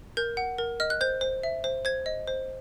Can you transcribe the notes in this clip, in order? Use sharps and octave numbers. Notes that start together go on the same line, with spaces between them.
A#4 G6
F#5
A#4
D#5 F6
F#6
C5 G6
C5
E5
C5
C5 G#6
D#5
C5